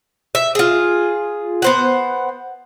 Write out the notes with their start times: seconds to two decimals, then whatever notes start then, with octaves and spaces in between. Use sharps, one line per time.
0.35 E5
0.55 F4 G#4
1.62 B3 C5 F#5